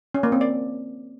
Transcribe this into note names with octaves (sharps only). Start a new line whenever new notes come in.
C#4
A#3
C4
D5